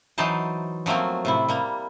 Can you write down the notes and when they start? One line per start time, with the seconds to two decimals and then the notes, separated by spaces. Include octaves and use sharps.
0.18 E3 F#3 D#4 C5 A5
0.86 F3 F#3 A3 A#3 C4
1.25 A2 C3 E4
1.49 G3 A#3